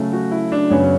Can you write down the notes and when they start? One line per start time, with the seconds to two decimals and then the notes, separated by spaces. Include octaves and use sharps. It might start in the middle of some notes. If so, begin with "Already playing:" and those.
Already playing: C#3 F#3 A3
0.13 F#4
0.31 E4
0.52 D4
0.70 F#2 C#3 F#3 B3 C#4